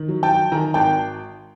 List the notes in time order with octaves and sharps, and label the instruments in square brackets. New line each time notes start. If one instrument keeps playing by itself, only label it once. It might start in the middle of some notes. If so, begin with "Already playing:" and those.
Already playing: [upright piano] D#3
F#3
G5 A5
F#3
D#3 G#5 A#5
G#1 G5 A5